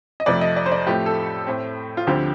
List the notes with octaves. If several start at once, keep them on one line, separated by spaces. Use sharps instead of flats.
D#5
F2 C3 F3 A3 D5
D#5
D5
C5
D5
A2 F3 A3 C4 G4
A4
A2 A3 C4
F4
D2 D3 F3 C4 G4